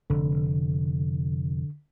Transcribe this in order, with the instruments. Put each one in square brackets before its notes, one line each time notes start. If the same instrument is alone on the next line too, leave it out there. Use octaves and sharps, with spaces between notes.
[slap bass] F1 [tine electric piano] D3